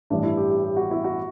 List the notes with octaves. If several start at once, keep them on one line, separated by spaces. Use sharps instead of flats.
A1 G2 E3 D4
E4
G4
G4
G4
F#4
E4
F#4